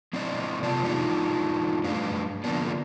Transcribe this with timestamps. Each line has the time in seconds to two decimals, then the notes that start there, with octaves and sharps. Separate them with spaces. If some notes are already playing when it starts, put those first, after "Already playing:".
0.13 G#3 C4 E4 D5 D#5
0.63 C3 B3 F4 D5 A5
0.83 G#3 D4 D#4 F4 G4
1.84 G2 A3 D4 B4 F5
2.44 D3 F3 A#3 B3 D4